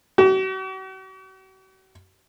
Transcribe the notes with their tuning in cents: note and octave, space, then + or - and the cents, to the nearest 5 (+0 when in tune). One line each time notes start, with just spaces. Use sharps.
F#4 +45